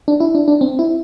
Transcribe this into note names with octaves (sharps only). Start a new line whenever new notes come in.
D4
E4
D4
D4
C4
E4